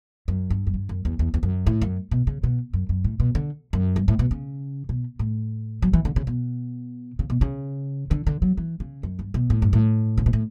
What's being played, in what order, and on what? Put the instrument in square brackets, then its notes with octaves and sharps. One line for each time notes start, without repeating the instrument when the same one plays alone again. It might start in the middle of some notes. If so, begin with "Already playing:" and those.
[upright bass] F#2
G2
F#2
G2
F#2
E2
E2
E2
F#2
A2
F#2
B2
C#3
B2
F#2
F#2
A2
B2
D3
F#2
G2
A2
B2
C#3
B2
A2
F#3
E3
D3
C#3
B2
C#3
B2
C#3
D3
D3
F#3
E3
C#3
F#2
G2
B2
A2
G2
A2
C#3
B2
A2